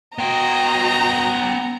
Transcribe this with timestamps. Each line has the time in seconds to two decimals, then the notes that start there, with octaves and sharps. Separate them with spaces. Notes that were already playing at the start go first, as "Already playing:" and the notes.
0.18 B3 F#4 D#5 G5 A#5